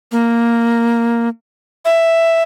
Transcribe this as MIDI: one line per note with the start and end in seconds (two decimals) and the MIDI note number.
0.12 1.29 58
1.85 2.43 76